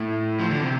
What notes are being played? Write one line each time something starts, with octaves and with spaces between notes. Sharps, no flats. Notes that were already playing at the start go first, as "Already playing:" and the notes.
Already playing: A2
F3
D3
C3